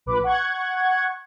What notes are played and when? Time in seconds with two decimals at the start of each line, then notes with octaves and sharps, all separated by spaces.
0.06 A#1 B4 D6
0.24 F#5 C#6 G#6